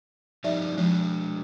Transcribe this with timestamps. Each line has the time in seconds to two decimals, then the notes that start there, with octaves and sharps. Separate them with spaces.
0.44 F3 G3 D#4 D5 E5
0.78 F3 G#3 D4